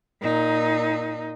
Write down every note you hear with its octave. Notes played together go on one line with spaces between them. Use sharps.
A#2 D#4